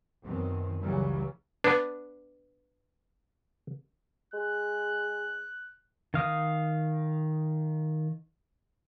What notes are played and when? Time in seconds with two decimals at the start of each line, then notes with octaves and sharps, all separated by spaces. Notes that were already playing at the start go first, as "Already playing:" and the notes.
0.24 F#2 B2 D#3 C4
0.81 C#2 C#3 E3 F#3 G3
1.64 B3 D4 B4
4.33 G#3 F#6
6.14 D#3 F5 D#6